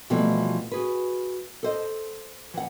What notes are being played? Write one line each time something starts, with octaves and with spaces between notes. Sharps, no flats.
B2 E3 F3 G3 A3 C4
F#4 G#4 B4
A4 C5 D#5
E3 F#5